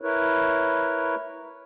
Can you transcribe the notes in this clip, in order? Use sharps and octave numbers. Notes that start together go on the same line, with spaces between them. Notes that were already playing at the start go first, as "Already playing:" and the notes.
E4 A#4 B4 C#5